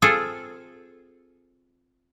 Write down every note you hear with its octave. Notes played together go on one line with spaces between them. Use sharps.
C4 F4 G#4 A4